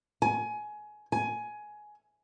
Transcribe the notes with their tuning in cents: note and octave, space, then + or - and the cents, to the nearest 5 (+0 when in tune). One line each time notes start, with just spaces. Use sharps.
G#5 +20
G#5 +15